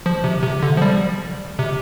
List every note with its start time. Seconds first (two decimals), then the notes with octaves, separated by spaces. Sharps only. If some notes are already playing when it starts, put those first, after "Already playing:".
0.06 F3
0.24 C3
0.43 C3
0.63 D3
0.77 F3
0.82 G3
1.59 C3